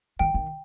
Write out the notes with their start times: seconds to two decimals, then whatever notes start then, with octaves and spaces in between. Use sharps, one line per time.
0.19 D#3 G5
0.34 D#3